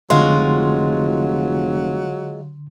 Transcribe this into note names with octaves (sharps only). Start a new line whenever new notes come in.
F1 D3 F#3 G#3 F4 F#4 C6